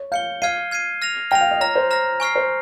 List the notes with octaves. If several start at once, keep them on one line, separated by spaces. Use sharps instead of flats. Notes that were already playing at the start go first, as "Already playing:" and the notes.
Already playing: C#5
F5 G6 C#7 G7
F5 F6 G#6 C7 D#7
F6 G#6 C7 D#7
F6 A#6 F7
G5 F6 A#6 F7
F5
D#5
C#5 A#5 F6 A#6
C5
A#5 F6 A#6
G#5 C#6 F6 C7
C5